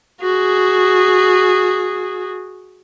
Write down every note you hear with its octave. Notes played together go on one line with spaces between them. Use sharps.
F#4 G#4